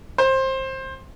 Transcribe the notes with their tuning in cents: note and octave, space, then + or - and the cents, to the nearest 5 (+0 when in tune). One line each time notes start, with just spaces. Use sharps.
C5 +20